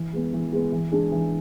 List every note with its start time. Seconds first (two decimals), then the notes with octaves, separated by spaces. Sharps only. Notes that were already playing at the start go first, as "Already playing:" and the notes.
Already playing: E3
0.13 G#3 B3
0.33 E3
0.52 G#3 B3
0.72 E3
0.92 G#3 D4 G#4
1.12 E3